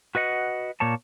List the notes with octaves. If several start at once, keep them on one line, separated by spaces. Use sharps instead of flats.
F#4 B4 D#5 F#5
A#2 A#3 C#5 A5